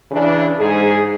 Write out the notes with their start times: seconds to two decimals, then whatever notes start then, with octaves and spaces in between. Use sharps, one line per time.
0.11 C#3 E3 D4
0.59 G#2 G#4